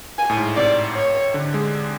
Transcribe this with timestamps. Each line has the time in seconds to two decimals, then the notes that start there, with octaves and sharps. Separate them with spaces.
0.18 G#5
0.30 A2
0.37 G#2
0.56 C3 D5
0.96 C#5
1.34 D3
1.54 G#3